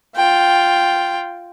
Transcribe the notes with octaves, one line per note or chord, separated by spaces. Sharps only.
F4 G5